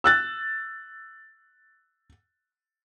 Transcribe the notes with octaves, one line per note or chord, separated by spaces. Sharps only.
E6 F#6 A6